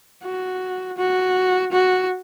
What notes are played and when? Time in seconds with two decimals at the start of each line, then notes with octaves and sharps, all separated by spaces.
0.24 F#4
0.98 F#4
1.72 F#4